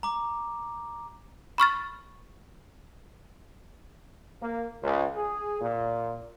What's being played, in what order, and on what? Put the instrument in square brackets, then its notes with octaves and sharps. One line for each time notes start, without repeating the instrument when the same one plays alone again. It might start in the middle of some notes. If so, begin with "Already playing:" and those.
[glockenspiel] A#5 D6
[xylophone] B5 C#6 F6 A6
[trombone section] A#3
C#2
G#4
A#2